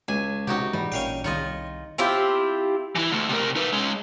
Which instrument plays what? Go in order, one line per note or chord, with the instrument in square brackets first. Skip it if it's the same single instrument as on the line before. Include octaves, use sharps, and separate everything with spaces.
[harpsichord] C#2 [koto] G#5
[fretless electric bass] C3 [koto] D#4 F#4 G4
[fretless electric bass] G#2 E3 G#3 [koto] G3
[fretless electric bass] A1 A#2 [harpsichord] C#4 F5 G5
[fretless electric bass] C2 [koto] D#3 F4 D#5 [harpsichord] C#5
[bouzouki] C4 E4 F4 G4
[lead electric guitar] E3 E4
D2 A3
C3 A#4
D#4 B4
G#3 C#4